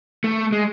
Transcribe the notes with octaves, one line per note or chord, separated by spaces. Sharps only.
A3
G#3